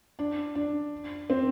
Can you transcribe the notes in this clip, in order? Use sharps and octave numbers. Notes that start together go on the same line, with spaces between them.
D4
D4
C4